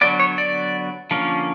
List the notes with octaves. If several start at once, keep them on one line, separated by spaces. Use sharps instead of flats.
D3 F#3 B3 D5
C#5
D5
D3 F3 A#3 C#4